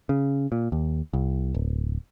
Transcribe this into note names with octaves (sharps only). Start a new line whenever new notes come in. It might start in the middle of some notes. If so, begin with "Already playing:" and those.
C#3
A#2
D#2
C2
D1